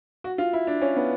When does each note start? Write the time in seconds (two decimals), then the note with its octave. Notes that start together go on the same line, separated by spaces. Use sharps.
0.24 F#4
0.38 F4
0.53 E4
0.67 D4
0.81 C#4
0.97 B3